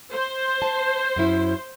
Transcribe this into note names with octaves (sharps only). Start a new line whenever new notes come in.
C5
A5
F#2 C#4 E4